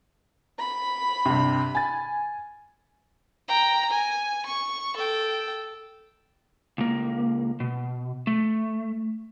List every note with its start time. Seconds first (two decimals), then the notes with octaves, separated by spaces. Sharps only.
0.57 B5
1.26 G2 C3
1.75 G#5 A6
3.48 G5 A#5
3.90 G#5
4.46 C#6
4.96 A4 G5
6.78 C#2 A#3
7.60 B2
8.27 A3